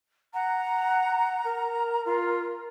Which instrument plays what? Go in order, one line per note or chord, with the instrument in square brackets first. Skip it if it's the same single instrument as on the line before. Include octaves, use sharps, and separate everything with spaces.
[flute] F#5 [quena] A#5
[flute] A#4
[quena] F4